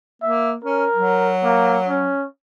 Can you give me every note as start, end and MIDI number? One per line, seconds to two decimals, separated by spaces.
0.22 0.56 58
0.22 0.51 76
0.64 0.84 61
0.64 1.32 70
0.95 2.12 54
1.44 1.78 58
1.88 2.26 61